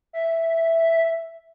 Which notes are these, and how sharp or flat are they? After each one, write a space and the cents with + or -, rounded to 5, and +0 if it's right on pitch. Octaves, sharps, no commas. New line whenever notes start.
E5 +0